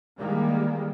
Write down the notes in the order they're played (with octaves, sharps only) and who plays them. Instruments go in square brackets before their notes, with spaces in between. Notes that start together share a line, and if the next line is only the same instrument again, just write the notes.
[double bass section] D#3 E3 G3 G#3 A#3